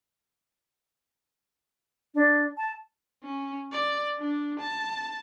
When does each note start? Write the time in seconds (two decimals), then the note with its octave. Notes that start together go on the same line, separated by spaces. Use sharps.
2.14 D4
2.57 A5
3.23 C#4
3.72 D5
4.19 D4
4.60 A5